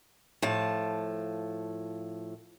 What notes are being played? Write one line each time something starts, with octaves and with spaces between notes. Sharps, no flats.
A2 F3 A5